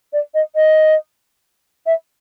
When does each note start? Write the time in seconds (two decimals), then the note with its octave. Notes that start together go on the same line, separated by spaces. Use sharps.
0.13 D5
0.34 D#5
0.55 D#5
1.86 E5